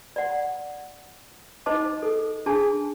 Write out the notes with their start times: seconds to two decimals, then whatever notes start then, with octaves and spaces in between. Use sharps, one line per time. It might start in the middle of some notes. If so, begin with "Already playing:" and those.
0.16 D5 F#5
1.66 D#4 C5 D#5 A5 D6
2.03 A4
2.46 D4 G#4 G#5 A5